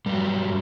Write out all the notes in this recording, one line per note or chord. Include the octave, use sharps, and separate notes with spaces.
G2 F#3 G3